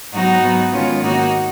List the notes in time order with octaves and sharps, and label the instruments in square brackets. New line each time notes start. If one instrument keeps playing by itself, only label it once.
[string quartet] G#2 F#3 B3 D#4 F#4
G#2 F#3 B3
G#2 D#3 G#3 B3 C#4 F4
G#2 D#3 A#3 D#4 F#4